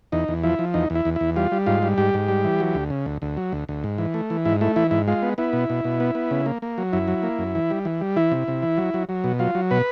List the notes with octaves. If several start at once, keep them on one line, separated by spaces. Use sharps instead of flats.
E2 D#4
E2
F3 E4
F3
E2 D#4
E2
E4
E2
E2 E4
G3 F4
G3
G#2 F4
G3
G#2 G4
G#2
G3
E3
F#3
D2
C#3
D2
D2
F#3
D2
D2
G#2
E3
A3
E3
G#2 E4
A3 E4
E3 E4
G#2 E4
G#3 F4
B3
B3 E4
B2
B2
B2
B3
B3
C#3
A#3
A#3
F#3
F#2 E4
F#3
A#3
F#2
E3
G3
E3
G3
E3 E4
C3
C3
E3
F#3
F#3
F#3
B2
F#3 F4
F#3
B2 B4